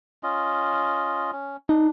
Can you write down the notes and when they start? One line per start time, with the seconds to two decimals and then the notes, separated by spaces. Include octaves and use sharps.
0.23 C#4 F4 D#5
1.32 C#4
1.69 D4 D#4